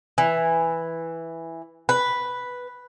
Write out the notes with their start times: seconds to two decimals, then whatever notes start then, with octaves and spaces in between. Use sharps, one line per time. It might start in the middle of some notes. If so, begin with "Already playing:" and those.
0.18 E3
1.89 B4